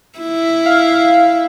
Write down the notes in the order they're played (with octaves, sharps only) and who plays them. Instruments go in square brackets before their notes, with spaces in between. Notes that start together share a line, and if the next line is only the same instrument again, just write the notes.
[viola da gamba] E4
[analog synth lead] F5